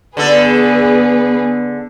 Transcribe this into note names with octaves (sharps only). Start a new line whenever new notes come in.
D3 B3 G#4 A4 B4